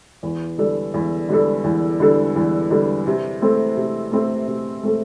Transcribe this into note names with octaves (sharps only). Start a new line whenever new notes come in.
E2
D3 G3 D4 A4
E2
D3 G3 D4 A4
E2
D3 G3 D4 A4
E2
D3 G3 D4 A4
C3
A3 C4 A4
C3
A3 C4 A4
C3
A3 C4 A4